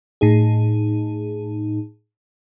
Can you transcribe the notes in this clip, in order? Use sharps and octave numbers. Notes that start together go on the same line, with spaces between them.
A2 D#4 G#4